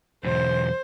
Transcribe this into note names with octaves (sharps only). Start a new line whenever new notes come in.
B1 E2 C5